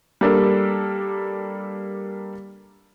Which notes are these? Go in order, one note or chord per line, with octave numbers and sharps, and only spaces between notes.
G3 A#3 D4 A4 A#4